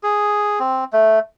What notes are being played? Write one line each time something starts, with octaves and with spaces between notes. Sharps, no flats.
G#4
C4
A3